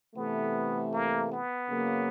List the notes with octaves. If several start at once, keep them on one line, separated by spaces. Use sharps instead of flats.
C3 E3 A3 B3
A#3
B3
C#3 F#3 A#3